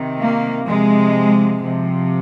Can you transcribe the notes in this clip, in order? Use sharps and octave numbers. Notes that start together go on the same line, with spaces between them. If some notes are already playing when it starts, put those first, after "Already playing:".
Already playing: C3 D#3
A#3
C3 F3 G#3
C3 F3